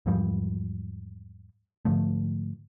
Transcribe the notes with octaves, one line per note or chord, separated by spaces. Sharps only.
E2 G#2 F3 G3
G#2 D3 F3 A3